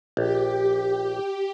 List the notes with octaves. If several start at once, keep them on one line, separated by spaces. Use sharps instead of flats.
A#1 G4